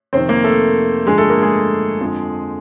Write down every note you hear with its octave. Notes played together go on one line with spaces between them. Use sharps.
F2 C3 D#3 C4 C5
A#3 A#4
A3 A4
G2 D3 F3 G#3 G#4
A3 A4
A#3 A#4
G#3 G#4
F2 D3 F3